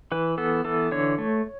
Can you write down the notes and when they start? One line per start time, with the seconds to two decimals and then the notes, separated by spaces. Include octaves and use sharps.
0.12 E3 B4
0.38 B3 A4
0.64 E3 A4
0.92 D3 C#5
1.18 A3